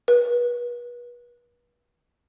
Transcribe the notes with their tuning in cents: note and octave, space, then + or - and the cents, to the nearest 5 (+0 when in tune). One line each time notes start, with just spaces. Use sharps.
B4 -35